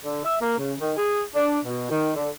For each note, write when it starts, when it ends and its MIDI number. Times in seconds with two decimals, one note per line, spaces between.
0.04 0.22 50
0.24 0.35 76
0.41 0.58 58
0.58 0.73 49
0.80 0.92 51
0.96 1.22 68
1.35 1.58 62
1.64 1.90 47
1.90 2.12 51
2.15 2.30 50